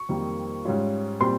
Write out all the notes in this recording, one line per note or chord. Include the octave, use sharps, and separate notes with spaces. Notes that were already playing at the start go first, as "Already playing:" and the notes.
Already playing: C#6
F2 D#3 G3 A#3
G#2 G3 C#4 F4
A#2 G3 C4 C6